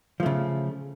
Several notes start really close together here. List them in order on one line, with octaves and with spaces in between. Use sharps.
F3 A3 C#3